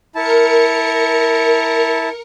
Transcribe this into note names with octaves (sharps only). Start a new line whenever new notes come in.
E4 A#4 A5 C#7